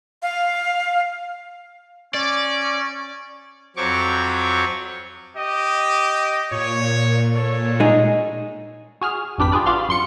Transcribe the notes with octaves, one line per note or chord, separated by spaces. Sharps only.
F5
C#4 D5
F2 F#3 C4 C#5 C#6 D6
G4 D#5
A#2 C#5
A4 C#5
G#3 D#4 G#4
F#4 G#4 F6
G#1 F2 D4 G4 B4 B6
D4 F4 G4 G#4 B4 D5
F4 F#4 D5 F5 C6
F#2 C6 C#7